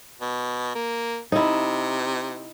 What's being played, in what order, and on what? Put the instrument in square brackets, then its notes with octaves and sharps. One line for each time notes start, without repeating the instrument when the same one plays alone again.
[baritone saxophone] B2
A#3
[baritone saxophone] C3 [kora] D#4 E4